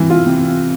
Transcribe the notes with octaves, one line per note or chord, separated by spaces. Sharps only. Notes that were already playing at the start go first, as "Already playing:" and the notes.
Already playing: C3 E3
F4
C3